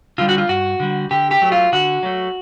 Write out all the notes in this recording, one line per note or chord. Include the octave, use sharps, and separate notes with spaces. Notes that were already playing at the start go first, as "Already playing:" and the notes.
D3 G3 F4
F#4
F4
G2 F#4
D3 G3
D3 G4
G4
F#3 A3
F4
D3 F#4
F#3 A3